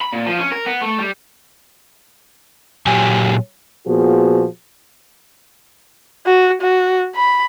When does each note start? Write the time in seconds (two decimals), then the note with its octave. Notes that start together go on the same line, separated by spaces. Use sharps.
0.01 B5
0.13 A#2
0.26 F3
0.39 C#4
0.52 A#4
0.66 B3
0.82 A3
0.99 G3
2.87 A#2 F#3 G4 G#5
3.87 A#2 F3 B3 F#4 G#4
6.26 F#4
6.62 F#4
7.16 B5